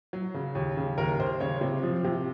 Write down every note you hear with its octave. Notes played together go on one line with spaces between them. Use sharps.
F#3
C#3
D#2
C#3
D#2 A#4
D#2 C5
C#3 C#5
C3 C5
F3
C3